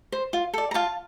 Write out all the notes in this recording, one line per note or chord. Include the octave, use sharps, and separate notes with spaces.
C5
F4
A4 D5
A#5
F4 F5 A5